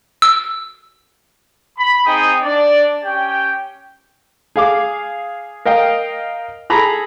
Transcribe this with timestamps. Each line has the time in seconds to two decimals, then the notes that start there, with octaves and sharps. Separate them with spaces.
0.22 E6
1.78 B5
2.07 C4 D#4 G#4 G5 D#6
2.43 D4 D5
3.04 C#4 G4 G5
4.56 G#4 F5 D6
5.65 A#4 D#5 F5 G5
6.70 G#4 A4 A#5 B5